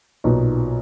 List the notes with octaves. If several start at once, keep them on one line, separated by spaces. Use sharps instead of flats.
B1 A#2 F#3 B3 D#4